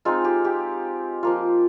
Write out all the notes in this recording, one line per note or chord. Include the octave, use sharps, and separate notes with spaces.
G#3 C4 D#4 F4
G4
G4
F3 A#3 F4